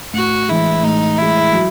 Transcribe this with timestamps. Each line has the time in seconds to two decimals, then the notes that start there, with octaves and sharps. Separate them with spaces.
0.13 A2 F#4
0.49 E3 G#3 E4
0.83 A2 D#4
1.18 E3 G#3 E4
1.53 F#3